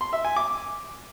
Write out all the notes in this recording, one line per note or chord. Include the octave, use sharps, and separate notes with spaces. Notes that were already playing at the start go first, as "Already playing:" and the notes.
C6
E5
G#5
D6